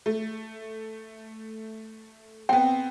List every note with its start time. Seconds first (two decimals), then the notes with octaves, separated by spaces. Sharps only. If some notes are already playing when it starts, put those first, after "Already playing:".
0.06 A3
2.49 B3 C4 G5